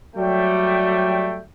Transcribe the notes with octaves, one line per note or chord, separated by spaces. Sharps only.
F#3 G3 A3 G5